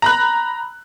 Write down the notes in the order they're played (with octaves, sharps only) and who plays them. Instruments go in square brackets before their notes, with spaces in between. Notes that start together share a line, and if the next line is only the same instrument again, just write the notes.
[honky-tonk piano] A#5 B5 F#6